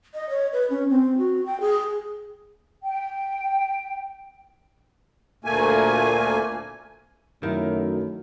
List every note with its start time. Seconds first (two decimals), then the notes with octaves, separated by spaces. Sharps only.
0.14 D#5
0.30 C#5
0.53 B4
0.70 C#4
0.90 C4
1.18 F#4
1.46 G5
1.61 G#4
2.82 G5
5.45 D2 A#2 A3 A#3 G#5
7.43 F#2 D#3 F#3 A3 E4 A#4